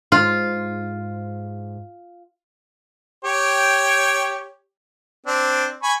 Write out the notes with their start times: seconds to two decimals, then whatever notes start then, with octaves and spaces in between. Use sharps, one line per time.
0.12 G#2 F4
3.25 G4 C#5 G5
5.26 C4 D4
5.83 G#5 B5 C#6